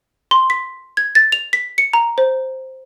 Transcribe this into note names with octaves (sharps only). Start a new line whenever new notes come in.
C6
B6
G#6
A6
F7
B6
C#7
A#5
C5